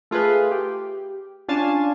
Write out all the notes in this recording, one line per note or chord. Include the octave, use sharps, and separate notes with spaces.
A3 F4 G#4 B4
G4
C#4 D4 F4 F5 G#5 A5